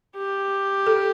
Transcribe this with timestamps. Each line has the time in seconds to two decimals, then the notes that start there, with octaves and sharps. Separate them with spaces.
0.16 G4
0.87 A4